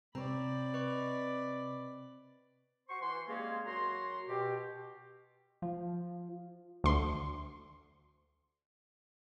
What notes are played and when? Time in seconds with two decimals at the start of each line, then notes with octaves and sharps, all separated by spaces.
0.15 C3 C4 C#5 D5 A#5 B5
0.74 B4 D#5 C#6
2.89 F#4 C5 C6 C#6
3.02 E3 C6
3.28 G3 G#3 A#3 C4 C#4 G#4
3.66 F#2 F#4 A#5 C6
4.29 B2 G4
5.62 F3
6.84 D2 C6